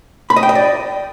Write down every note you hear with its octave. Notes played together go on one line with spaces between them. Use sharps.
B5
D#5
G5
D#5
D5